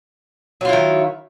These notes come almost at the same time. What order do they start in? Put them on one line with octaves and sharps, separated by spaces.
F#3 F4 E4 D#3